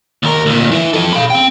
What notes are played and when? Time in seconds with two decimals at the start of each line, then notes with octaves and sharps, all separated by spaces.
0.23 D#2 A#4
0.46 D2 A#2
0.71 E3 E4
0.93 F3 A4
1.13 F5 B5
1.30 C4 G5